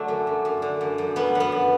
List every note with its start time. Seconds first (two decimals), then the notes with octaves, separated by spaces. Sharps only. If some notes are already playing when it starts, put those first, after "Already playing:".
Already playing: D3 F#3 A3 D4
0.08 F#2
0.27 F#2
0.45 F#2
0.62 D3
0.81 F#2
0.98 F#2
1.16 F#2 B3
1.35 F#2
1.40 B3
1.52 F#2